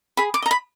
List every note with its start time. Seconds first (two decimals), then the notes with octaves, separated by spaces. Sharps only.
0.17 G#4 B5
0.34 D6
0.42 D#5 A#5
0.51 B5